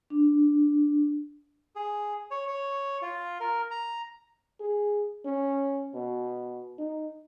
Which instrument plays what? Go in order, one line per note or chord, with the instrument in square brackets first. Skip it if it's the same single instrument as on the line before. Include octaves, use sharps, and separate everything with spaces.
[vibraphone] D4
[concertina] G#4
C#5
C#5
F4
A#4
A#5
[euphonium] G#4
C#4
B2
D#4